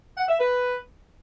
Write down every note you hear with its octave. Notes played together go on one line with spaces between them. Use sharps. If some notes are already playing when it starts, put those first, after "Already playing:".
F#5
E5
B4